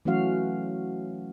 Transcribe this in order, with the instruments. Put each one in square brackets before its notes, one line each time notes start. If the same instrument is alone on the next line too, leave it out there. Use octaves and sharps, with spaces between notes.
[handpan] E3 F#3 A3 C#4 F#4 F5